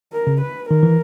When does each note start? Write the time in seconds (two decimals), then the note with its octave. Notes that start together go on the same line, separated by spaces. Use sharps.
0.13 A#4
0.27 C#3
0.41 B4
0.70 D#3 A#4
0.83 E3